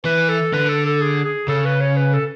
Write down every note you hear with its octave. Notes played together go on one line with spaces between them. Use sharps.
E3 B4
A4
D3 B4
A4
A4
G#4
G#4
C#3 A4
B4
C#5
B4
A4